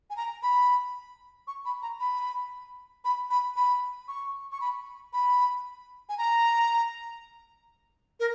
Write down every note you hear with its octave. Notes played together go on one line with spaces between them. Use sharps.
G#5
A#5
B5
C#6
B5
A#5
B5
B5
B5
B5
C#6
C#6
B5
B5
G#5
A#5
A#4